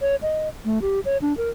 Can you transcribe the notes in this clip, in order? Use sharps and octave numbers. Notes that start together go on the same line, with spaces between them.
C#5
D#5
A3
G4
C#5
D4
A#4